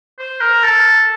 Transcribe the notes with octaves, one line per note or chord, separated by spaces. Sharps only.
C5
A#4
A4